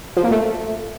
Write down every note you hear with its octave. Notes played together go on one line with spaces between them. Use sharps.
F3
A#3
A3